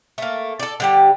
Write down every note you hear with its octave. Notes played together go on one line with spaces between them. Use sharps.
A3 A#3
A4 D5
D3 G3 G4